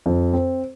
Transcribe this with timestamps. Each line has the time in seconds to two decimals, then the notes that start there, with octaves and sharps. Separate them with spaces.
0.06 F2
0.33 C4